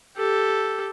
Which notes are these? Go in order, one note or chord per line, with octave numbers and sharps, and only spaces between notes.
G4 A4